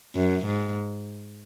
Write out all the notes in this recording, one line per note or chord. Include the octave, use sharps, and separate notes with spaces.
F#2
G#2